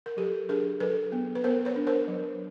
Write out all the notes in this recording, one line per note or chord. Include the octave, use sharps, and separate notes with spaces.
A#4
F#3 G4 A4
D4 G#4 A#4
F#3 A4 B4
B3
B4
B3 A#4 C5
B4 C#5
D4
A#4 C5
F#3